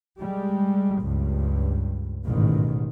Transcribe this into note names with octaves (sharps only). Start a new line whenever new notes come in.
G3 G#3
C#2 G2
A1 G#2 B2 D#3